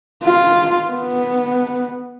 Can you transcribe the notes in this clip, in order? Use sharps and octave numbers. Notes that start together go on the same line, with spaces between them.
F4
B3